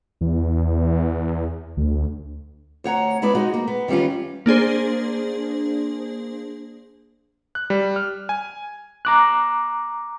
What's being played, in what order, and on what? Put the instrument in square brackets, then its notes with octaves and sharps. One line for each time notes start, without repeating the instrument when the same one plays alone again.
[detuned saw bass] E2
D2
[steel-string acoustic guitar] D2 C#5 F#5 A#5
G#3 B3 E4 B4 D5
G#3 D#4 F#4
A#3
B3
D#3 E3 G3 C#4 F4
[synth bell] A#3 D4 G#4 C5
[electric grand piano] F#6
G3
F6
G#5
[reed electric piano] A#5 D6 F#6